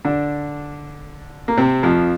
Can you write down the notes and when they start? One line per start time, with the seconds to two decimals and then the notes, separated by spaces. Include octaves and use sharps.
0.05 D3 D4
1.48 A#3
1.57 C3 C4
1.83 F2 F3